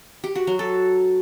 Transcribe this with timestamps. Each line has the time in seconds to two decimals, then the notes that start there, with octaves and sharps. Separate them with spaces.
0.24 G4
0.35 F#4
0.47 F#3
0.59 A4